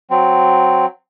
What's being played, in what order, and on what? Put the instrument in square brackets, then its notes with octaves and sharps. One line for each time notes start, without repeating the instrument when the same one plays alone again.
[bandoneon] F#3 C4